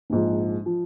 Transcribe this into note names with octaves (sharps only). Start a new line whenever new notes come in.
A#1 G#2 F3
F3